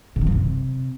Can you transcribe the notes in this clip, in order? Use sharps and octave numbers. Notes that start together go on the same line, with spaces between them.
C3
D#3
F#2
C3